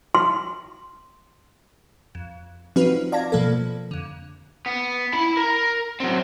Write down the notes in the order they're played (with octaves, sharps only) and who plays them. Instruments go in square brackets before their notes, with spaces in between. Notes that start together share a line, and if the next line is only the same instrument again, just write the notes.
[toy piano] C6
[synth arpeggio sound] F2
F3 C4 D#4 F4 F#4 B4
D5 F5 A5 G#6 A#6
B2 F3 A#3 A4
F2 D3
[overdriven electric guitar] B3
E4 B5
A#4
F#3 C4